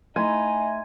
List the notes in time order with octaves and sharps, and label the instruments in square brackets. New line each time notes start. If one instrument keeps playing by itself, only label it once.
[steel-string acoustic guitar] A3 E4 E5 [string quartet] D#4 [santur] G#5 [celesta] C6